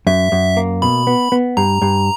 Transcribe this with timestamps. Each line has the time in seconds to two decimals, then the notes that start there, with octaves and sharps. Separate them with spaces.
0.07 F#2 E5
0.32 F#2
0.57 A#3
0.82 B2 B5
1.07 B3
1.32 B3
1.57 G2 A#5
1.82 G2